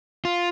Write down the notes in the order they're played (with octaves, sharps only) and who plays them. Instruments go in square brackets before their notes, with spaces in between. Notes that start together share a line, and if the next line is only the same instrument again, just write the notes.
[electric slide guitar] F4